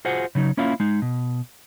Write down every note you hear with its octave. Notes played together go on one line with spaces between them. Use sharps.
F4 F#4 G#4 C5 F#5
C#3 F#3 D#4
A#3 C#4 E4 F4 F5
G#3 D#4
B2